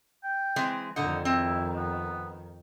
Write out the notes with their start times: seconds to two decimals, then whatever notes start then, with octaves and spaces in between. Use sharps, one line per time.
0.24 G5
0.56 E3 G#3 C4
0.96 F2 D3 D#3 D#4 F#5
1.25 C4 E4
1.76 B3